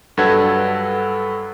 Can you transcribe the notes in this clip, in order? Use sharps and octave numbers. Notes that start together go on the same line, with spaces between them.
G2 F#3 A4 B4 F#5 G#6